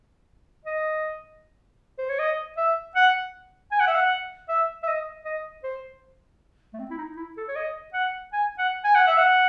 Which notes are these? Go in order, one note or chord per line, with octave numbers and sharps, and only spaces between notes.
D#5
C5
C#5
D#5
E5
F#5
G#5
F#5
E5
F#5
E5
E5
D#5
D#5
C5
A3
C4
E4
D#4
E4
A4
C#5
D#5
F#5
G#5
F#5
G#5
F#5
E5
F#5